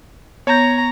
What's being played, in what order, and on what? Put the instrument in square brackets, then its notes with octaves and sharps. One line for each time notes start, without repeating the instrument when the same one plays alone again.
[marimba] B3 G6 [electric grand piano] C#5 [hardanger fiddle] A#5